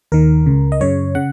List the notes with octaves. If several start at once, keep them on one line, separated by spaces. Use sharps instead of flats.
D#2 D#3 A#4
C#2 C#3
D#5
F#2 C#3 C#5
C#3 F#5